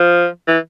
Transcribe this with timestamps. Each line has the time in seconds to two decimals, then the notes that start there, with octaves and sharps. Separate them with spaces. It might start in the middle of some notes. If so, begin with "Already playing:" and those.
Already playing: F3
0.47 E3